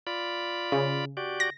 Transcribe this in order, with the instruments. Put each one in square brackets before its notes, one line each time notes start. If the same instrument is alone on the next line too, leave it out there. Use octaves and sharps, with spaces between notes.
[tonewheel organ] F4 D5 B5
[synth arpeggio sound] C#3
[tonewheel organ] F#4 G4 D5
[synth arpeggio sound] A#6